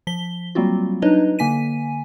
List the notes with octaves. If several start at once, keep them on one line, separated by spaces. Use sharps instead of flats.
F3 B6 G7
F#3 G3 A#3 C4 F4 F#4
F#3 D4 D#4 B4 C#5 D#5
D3 A#3 G#5 B6 D#7